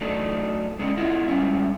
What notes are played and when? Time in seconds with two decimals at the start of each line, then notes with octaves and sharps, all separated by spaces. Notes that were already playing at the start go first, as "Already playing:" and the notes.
0.01 F#3 A3 D4 D#4
0.79 G#3 C#4 D4
0.97 E4 F4 D#5 E5 F#5
1.28 G3 G#3 C#4 E5